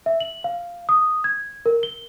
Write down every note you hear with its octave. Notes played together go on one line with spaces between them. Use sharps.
E5
F#7
F5
D#6
G#6
A#4
G7